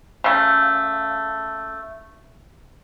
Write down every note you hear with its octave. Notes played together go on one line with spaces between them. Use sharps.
C#3 A3